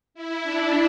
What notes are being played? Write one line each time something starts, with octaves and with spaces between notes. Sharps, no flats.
E4
D4